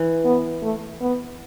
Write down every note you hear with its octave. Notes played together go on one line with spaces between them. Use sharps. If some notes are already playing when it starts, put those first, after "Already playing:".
Already playing: E3
B3
A3
B3